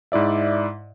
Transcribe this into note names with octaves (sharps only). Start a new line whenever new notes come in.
G#2 E4 D5 E5